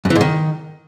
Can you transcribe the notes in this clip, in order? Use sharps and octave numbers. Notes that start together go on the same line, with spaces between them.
F#2
E3
G#2
D#3